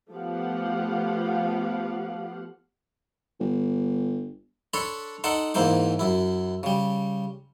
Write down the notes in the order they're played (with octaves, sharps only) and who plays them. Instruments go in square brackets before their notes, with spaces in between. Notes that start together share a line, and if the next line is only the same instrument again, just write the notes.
[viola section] F3 A3 B3 G4 F5 F#5
[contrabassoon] G1
[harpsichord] D4 A4 C#5 B5 C6
D#4 A4 D5 F#5 A5 C6
E2 G#2 A#3 E4 C5 D6
F#2 E4
C#3 G3